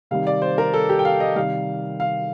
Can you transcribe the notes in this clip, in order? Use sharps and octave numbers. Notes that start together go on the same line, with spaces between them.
C3 D#3 G3 F5
D5
C5
A#4
A4
G4
G5
F5
D#5
C3 D#3 G3 F5
F5